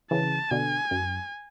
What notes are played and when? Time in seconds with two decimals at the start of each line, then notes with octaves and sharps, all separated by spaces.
0.11 C#3 E3 A5
0.51 B2 D3 G#5
0.91 F#2